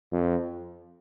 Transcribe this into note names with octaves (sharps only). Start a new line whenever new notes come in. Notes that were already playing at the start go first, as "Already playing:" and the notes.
F2